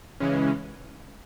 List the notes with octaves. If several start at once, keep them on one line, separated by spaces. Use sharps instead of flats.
C#3 E3 G#3 C#4